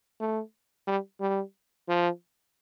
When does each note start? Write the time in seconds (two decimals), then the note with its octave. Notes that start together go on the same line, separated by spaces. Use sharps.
0.20 A3
0.87 G3
1.20 G3
1.88 F3